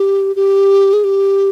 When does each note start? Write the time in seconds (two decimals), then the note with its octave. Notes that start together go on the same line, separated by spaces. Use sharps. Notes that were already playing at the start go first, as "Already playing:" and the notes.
Already playing: G4
0.36 G4
0.93 G#4
1.04 G4